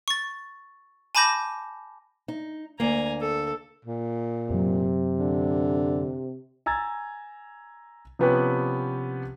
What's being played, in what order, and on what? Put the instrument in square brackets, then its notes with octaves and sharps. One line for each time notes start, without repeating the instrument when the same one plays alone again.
[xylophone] C#6 A6
G#5 A5 B5 D6 G6 A#6
[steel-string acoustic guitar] D#4
[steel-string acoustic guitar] D2 A#3 [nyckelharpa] G#5 A#5
[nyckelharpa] A4
[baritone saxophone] A#2
[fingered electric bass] F#2 F#3 [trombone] C3
[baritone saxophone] D3
[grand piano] G#5 A#5 E6 G#6 A6
C3 F3 B3 C#4 G4 B4